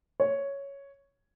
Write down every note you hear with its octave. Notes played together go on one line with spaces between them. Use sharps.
C#5